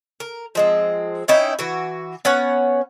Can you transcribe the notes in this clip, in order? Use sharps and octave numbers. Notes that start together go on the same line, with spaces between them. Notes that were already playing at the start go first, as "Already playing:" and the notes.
A#4
F3 G#3 C4
C#4 D#4 E4 G5
E3 F#4
B3 C#4 C#5 F#5